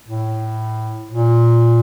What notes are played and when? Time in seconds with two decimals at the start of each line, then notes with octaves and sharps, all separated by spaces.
0.08 A2
1.12 A#2